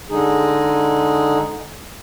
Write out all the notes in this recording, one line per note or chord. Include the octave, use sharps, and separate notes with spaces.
D3 G#3 D#4 G#4